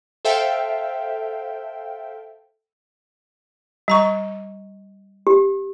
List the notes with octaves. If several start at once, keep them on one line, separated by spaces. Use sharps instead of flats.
A4 C5 E5 F5 G5
G3 A#5 C#6
G4